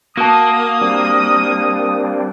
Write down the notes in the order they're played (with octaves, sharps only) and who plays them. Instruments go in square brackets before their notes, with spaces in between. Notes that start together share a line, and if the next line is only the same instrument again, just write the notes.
[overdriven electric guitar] A#3 [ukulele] F#4 A5 [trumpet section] D#6
[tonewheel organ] G3 C4 D4